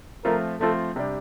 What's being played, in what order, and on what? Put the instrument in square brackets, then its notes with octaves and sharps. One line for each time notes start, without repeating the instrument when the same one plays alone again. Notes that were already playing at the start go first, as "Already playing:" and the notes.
[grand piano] F3 A3 C4 F4 [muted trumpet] A#4
[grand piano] F3 A3 C4 F4 [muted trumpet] A4
[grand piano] C3 G3 D4 G4